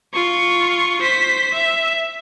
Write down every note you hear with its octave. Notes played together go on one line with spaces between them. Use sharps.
F4 C#6
C5 B6
E5